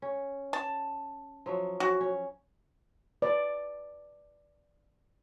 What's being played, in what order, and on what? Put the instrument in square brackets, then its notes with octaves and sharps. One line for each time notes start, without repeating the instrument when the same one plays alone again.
[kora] C#4
[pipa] A5
[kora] F3 F#3 E5
[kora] C#4 [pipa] F#4
[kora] C#4
[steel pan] B4 D5